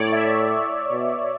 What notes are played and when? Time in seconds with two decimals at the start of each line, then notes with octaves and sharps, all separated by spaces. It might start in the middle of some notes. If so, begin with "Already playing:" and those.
Already playing: A2 C#5 D5
0.12 E5
0.91 B2